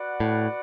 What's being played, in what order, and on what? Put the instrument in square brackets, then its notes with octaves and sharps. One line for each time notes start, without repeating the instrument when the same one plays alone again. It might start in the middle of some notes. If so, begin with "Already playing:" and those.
Already playing: [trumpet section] F#4 B4 D5 F#5
[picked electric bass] A2